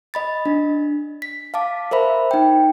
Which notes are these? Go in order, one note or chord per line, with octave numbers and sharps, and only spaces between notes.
D#5 B5 A6
D4
B6
F5 A5 D6
A#4 C5 E5 B5
D#4 G5